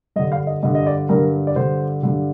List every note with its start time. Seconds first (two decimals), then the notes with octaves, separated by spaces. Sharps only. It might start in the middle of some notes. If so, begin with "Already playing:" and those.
0.16 G2 D#5
0.19 D3
0.32 F5
0.47 D#5
0.63 G2 D3 D#5
0.75 D#5
0.87 D5
1.09 G2 D3 A#4
1.47 D5
1.56 G2 D3 C5
2.03 G2 D3